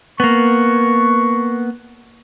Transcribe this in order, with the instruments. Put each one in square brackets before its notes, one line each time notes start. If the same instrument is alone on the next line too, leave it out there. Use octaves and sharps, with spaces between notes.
[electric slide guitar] A#3 B3 [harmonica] C#6